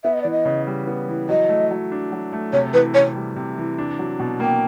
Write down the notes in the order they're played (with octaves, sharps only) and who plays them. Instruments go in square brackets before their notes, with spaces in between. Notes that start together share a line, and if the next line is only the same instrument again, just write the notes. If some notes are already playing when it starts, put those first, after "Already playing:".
[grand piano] B3 [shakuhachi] E5
[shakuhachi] D#5
[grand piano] E3 [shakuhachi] D5
[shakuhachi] D#5
[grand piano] C#3
G3
B3
E3
[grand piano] F#3 [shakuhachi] D#5
[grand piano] A3
F#3
D4
F#3
A3
[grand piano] C3 [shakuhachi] C#5
[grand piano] E3 [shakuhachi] B4
[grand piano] C3 [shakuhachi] C#5
[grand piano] G3
C3
E3
D4
F#3
B2
[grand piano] A#3 [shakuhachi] G5